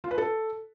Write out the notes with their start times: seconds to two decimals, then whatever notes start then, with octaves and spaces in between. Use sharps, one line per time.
0.04 F4
0.11 B4
0.18 A4